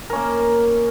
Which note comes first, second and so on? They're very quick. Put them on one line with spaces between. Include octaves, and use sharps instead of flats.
A#4 C#4 A#3